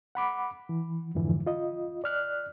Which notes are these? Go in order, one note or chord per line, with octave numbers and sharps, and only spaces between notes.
F#5 B5 D6
E3
F2 G#2 D3 E3 F3
F4 D#5
D5 F6 F#6